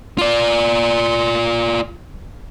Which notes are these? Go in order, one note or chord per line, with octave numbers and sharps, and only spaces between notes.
F4 D5